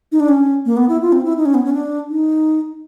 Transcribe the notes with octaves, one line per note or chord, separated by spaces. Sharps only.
D#4
D4
C#4
A#3
B3
E4
F4
C4
E4
D#4
C#4
B3
C#4
D4
D#4